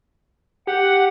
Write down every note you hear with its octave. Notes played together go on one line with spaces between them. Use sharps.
G4 F#5